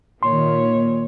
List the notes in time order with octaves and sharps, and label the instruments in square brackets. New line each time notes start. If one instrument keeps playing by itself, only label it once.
[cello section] A#2 [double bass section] D#3 [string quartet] C#5 [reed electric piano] C6